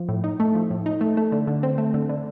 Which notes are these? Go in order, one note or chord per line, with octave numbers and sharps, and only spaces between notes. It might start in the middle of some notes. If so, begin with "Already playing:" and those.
Already playing: F3
A2
D#4
A3
F3
A2
D#4
A3
A3
D3
D3
C4
A3
D3
D3